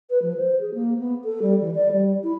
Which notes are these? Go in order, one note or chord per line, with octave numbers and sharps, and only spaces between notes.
B4
F3
C5
G#4
A#3
B3
A4
G3
E3
D5
G3
E4